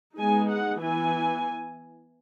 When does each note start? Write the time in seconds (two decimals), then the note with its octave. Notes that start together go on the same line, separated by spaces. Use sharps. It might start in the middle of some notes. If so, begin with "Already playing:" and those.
0.18 G#3 B3 D#4 G#5
0.50 F#5
0.82 E3 B3 E4 G#5